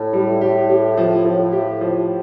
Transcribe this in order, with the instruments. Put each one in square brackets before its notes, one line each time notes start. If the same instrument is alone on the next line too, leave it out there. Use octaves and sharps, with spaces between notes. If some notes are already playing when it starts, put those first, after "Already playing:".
Already playing: [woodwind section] A2
[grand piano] G3
[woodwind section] A2 [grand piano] G4
[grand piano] G4
F3
[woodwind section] A2 [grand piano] F3
[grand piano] G4
F3